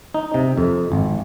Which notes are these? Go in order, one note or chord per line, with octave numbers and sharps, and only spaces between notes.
D#4
C3
F2
G#1